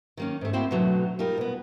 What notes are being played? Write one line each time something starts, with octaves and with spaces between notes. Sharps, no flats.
D#3 A#3 C#4
G#2 A3
A#3 C4 E4 F#4 C5
B2 D3 F#3 A3
G3 D#4 F4 A#4
B2 B3